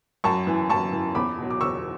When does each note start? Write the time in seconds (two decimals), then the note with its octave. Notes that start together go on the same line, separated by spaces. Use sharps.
0.24 F#2 A5 C#6
0.47 E3
0.69 F#2 A5 C#6
0.92 E3
1.15 E2 B5 D6
1.38 B2 F#3
1.50 D6
1.61 E2 C#6 E6